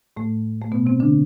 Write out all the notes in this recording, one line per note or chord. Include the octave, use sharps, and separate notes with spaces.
A2 A3
A3
B2 B3
C3 C4
D3 D4